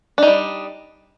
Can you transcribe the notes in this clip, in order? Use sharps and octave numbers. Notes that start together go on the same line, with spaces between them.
G3 D4 D#4